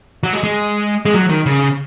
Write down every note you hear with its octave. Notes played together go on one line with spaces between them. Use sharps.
F#3
G#3
G#3
G#3
F#3
D#3
C#3